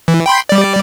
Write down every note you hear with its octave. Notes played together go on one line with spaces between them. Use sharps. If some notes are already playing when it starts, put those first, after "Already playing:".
E3
G5 B5 C6
G3 D5